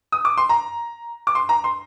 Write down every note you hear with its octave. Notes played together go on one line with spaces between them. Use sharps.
D#6
D6
C6
A#5
D6
C6
A#5
C6